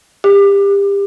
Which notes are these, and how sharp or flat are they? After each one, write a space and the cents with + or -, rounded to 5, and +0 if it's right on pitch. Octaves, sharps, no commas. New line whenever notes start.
G4 +30